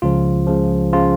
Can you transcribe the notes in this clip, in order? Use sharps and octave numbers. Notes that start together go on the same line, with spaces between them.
C#2 C#3 F3 F4
C#2 C#3 F3
C#3 F3 F4